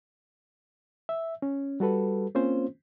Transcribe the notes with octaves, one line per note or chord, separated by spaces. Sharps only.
E5
C#4
G3 F#4 A4 B4
A#3 C4 C#4 F4 C5